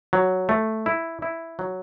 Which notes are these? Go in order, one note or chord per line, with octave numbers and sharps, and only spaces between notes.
F#3
A3
E4
E4
F#3